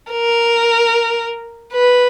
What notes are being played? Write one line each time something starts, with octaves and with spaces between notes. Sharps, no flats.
A#4
B4